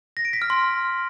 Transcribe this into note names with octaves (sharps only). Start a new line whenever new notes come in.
A#6
D7
B6
F6
C6